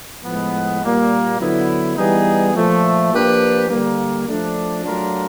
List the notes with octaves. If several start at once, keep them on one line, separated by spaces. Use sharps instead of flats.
A2 F3 G#3 B3
A#2 G3 A#3
D3 F#3 B3 E4
E3 G3 B3 D#4 G#4
A#2 F3 A3
F3 A#3 D4 G4 B4
D3 G3 A#3
F3 A3 D4
F#3 A3 D4 F4 A#4